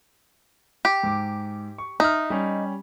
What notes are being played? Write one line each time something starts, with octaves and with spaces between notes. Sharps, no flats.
G4
G#2 D6
C#6
D#4 E5 F6
G3 C#4